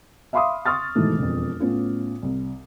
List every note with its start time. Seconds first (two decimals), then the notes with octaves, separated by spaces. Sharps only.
0.33 E5 F5 B5 C6 D6 D#6
0.66 C6 C#6 D#6 F6 A6
0.95 G#2 B2 D#3 E3 A3
1.19 E1 F2
1.60 A2 B3 C#4 F4
2.23 C2